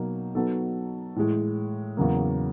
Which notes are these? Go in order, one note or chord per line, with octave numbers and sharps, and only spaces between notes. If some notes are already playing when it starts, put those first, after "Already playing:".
Already playing: B2 F#3 A#3 D#4
F#3 B3 D#4 F#4 A4
A2 E3 G#3
E2 C#3 F#3 A#3